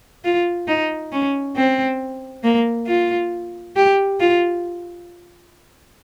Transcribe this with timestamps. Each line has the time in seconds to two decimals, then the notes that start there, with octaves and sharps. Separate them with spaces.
0.24 F4
0.68 D#4
1.12 C#4
1.56 C4
2.44 A#3
2.87 F4
3.76 G4
4.20 F4